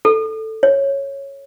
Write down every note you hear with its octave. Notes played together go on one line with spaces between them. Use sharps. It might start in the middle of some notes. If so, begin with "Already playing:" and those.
A4
C#5